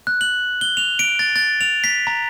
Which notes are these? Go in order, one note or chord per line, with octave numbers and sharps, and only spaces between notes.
F#6
F#7
G7
F7
D7
A6
A6
F7
B6
A#5